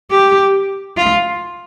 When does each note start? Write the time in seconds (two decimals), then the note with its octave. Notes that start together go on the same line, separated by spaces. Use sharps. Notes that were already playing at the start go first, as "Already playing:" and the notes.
0.11 G4
0.97 F4